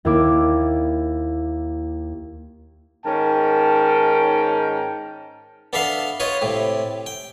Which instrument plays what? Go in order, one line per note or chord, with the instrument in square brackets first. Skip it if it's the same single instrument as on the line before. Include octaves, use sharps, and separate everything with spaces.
[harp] D#2 A#3 E4 D6
[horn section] G#2 D#3 C#4 A#4 G5 A5
[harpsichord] B3 D4 A4 E5 F5
F4 B4 C#5 D#5
A2 C3
G5